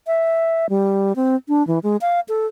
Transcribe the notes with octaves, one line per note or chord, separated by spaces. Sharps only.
E5
G3
C4
D4
E3
G#3
F5
A4